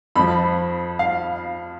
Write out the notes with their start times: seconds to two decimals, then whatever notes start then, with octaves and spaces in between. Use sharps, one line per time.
0.16 F2 F3 B5
0.99 F5